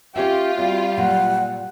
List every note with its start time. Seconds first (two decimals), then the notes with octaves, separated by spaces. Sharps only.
0.16 C#4 F4 G4 C#5 E5
0.58 G3 C4 F#4
0.97 A#2 F#3 F#5